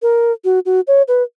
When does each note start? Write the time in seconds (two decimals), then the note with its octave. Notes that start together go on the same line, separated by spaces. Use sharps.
0.02 A#4
0.45 F#4
0.66 F#4
0.87 C#5
1.08 B4